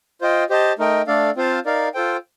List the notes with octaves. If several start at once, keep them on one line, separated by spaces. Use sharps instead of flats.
F4 C5 D#5 G5
G4 C5 D#5 A5
A3 D#4 A#4 D#5 G5
A3 D4 A4 D5 F5
C4 F4 C5 F5 A5
D#4 A#4 D5 F5
F4 A4 C5 G5